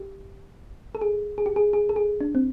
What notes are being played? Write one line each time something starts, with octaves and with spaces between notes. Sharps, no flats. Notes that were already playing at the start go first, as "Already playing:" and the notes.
Already playing: G4
A4
G#4
G#4
G4
G#4
G#4
A4
G#4
D4
C4